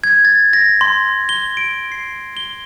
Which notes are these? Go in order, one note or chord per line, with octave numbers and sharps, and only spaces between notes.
G#6
A6
A#6
C6
G7
D7
C7
G7